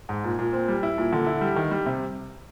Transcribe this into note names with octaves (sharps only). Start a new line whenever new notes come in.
G#2
A#2
A#2
C4
G3
E4
A#2
D3
E4
G3
D#3
G3
C3